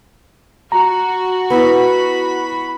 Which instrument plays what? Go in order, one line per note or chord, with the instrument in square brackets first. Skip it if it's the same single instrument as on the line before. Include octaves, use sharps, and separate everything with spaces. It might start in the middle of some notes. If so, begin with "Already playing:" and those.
[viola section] F#4 [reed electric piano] A#5
[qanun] B3 E4 [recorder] B5